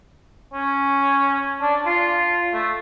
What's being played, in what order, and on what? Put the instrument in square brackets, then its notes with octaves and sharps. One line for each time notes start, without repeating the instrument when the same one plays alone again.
[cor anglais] C#4
D4
F4
A3